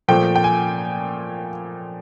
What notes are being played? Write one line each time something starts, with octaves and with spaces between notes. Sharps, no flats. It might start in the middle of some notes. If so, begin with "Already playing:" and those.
A#2 F3 A3 G5
G5
G#5